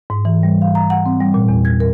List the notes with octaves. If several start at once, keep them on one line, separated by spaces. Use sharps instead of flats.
G#2
E3
G3
F5
A#5
F#5
C4
G3
A#2
E2
G#6
A#4